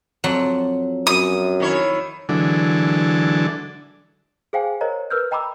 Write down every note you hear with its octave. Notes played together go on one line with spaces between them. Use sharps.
F2 F#3 F#5
F#2 D#6
D#3 E4 C#5
D3 E3 F#3 G#3 D4 A4
G#4 C5 F5 G5 G#5
A#4 C5 C#5 D#5 A#5
A#4 B4 E6 F6 G6
D#5 G5 A#5 B5 D6 E6